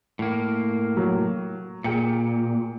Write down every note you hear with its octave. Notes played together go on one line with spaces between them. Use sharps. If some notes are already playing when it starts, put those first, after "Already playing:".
A2 A#3
F#3
A#2 G#4 G5 C#7